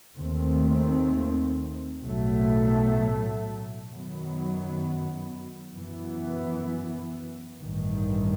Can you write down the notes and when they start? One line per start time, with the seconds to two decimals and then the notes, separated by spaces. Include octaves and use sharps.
0.17 D#2 D#3 A3 C4
2.03 B1 A2 F#3 A3
3.89 F#2 D#3 F#3 B3
5.75 F#2 E3 B3
7.60 A1 G2 D#3